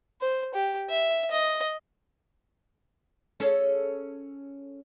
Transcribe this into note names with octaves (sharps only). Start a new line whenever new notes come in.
C5
G4
E5
D#5
C#4 G#4 A4